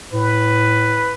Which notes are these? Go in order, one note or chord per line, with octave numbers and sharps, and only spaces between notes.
A2 B4